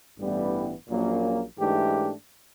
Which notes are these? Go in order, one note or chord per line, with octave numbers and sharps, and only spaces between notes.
A1 G2 E3 G3 B3
A#1 A#2 F#3 A#3 C#4
G#2 E3 A3 D4 G4